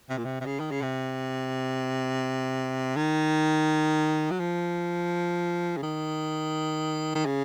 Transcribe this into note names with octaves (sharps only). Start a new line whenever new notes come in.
C3
A#2
C3
C3
C#3
D#3
C#3
C3
D#3
F#3
F3
C#3
D#3
D#3
C#3